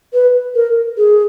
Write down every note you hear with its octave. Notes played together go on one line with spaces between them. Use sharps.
B4
A#4
G#4